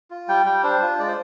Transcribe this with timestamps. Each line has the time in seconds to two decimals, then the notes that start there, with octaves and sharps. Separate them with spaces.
0.11 F4
0.28 G3 G5
0.46 G3 G5
0.63 D4 C5
0.82 F4
0.99 G#3 D5
1.08 C5